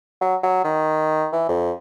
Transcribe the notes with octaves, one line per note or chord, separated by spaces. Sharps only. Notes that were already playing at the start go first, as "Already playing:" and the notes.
F#3
F#3
D#3
E3
F2